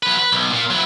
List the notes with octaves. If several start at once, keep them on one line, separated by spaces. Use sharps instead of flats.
F#3 B4
B4
B1
A#2
F#3 E4